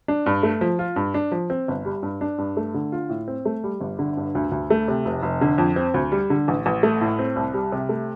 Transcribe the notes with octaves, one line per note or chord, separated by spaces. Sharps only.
D4
G2
A3
F3
F4
G2
D4
F3
C4
G1
G3
G2
D4
G2
A3
D3
F4
A2
C4
A3
G3
G1
D3
G2
D2
D2
A3
C3
F1
F1
D3
F2
C4
D2
G3
D3
A1
A1
A3
A2
C4
C2
G3
C3
A3